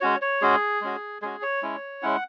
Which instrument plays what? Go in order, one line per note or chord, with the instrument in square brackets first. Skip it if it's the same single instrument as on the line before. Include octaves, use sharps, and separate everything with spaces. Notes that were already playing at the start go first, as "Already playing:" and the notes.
[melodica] G#3 C#4 F#4 C#5
C#5
G#3 C#4 F#4 G#4
G#3 C#4 F#4
G#3 C#4 F#4 G#4
C#5
G#3 C#4 E4
G#3 C#4 E4 F#5